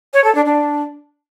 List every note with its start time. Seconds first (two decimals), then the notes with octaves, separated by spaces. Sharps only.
0.14 C#5
0.24 A4
0.35 D4
0.45 D4